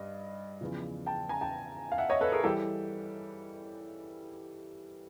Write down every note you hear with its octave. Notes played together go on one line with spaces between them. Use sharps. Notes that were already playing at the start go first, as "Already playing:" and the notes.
Already playing: G2 D#5
E2 C#3 F3
G5 A5
G#5 A#5
G5 A5
F5
E5 F#5
C#5 D#5
A4 B4
G#4 A#4
E3 G3 G4 A4